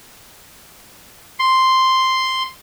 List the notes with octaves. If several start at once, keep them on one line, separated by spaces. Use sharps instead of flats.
C6